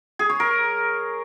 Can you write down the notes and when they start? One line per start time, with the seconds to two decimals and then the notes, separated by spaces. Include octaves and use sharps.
0.19 G#4
0.30 C#5
0.40 A#4